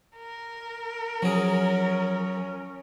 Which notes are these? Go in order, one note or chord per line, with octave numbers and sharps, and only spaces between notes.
A#4
F3 F#3 C#4 G#4